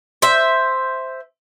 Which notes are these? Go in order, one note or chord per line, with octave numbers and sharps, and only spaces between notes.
C5 E5